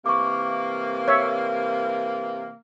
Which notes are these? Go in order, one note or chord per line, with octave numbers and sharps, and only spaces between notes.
C3 E3 A#3 C#6 D6
C#5 E5